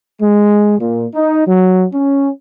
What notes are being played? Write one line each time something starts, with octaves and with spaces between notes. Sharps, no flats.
G#3
A#2
D#4
F#3
C#4